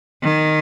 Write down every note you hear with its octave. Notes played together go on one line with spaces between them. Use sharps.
D#3